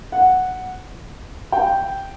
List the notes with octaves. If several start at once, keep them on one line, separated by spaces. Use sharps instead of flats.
F#5
G5